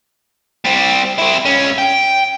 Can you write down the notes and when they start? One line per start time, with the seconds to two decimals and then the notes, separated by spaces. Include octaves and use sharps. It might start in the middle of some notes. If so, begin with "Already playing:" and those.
0.65 G3 C4
1.18 C4 E4
1.45 C#2 C#4
1.78 G5